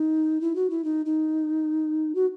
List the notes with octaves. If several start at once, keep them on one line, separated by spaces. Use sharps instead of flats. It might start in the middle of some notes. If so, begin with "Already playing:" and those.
Already playing: D#4
E4
F#4
E4
D#4
D#4
F#4